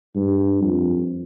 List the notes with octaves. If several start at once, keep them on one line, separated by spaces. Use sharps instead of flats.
G2
F2